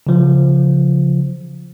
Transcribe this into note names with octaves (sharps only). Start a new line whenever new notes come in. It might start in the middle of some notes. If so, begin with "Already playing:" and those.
C#3 F3